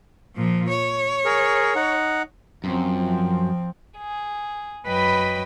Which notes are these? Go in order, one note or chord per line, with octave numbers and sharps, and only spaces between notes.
A#2 F3
C#5
G#4 A#4
D#4 F#5
F#2 F3 C4
G#4
F#2 F#3 B4 D#5 G5 B5